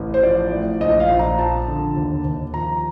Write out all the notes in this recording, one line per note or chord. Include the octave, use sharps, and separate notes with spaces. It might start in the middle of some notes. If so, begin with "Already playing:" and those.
Already playing: A1
C5
F3 D5
A2
A#1 D#5
F5
A#1
A#5
F3 A5
D3
D#2
D#2
F3 A#5